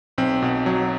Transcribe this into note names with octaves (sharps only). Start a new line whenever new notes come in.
B1 C4
B2
F#3